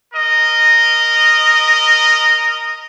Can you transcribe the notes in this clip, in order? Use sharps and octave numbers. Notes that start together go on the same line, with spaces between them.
A#4 D#5